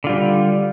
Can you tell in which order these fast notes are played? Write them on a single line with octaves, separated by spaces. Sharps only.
D3 F4 G3